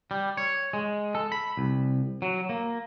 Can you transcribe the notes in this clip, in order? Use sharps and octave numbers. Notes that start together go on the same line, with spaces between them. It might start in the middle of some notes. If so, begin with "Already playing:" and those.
G3
C#5
G#3
A4
B5
C2
F#3
A#3